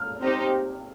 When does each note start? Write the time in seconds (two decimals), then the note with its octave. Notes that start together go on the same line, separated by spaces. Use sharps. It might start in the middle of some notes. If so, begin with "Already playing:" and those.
Already playing: F6
0.21 C4 D#4 G4